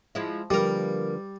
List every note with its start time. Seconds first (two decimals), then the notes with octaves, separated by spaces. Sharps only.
0.15 F3 G#3 E4
0.50 D3 F3 G3 A#3 A#4 B4